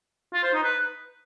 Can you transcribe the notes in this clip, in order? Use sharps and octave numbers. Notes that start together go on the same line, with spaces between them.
F4
C5
D#4
B4